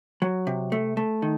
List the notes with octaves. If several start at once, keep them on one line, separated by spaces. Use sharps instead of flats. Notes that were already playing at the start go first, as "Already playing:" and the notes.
F#3
C3
A3
A3
D#3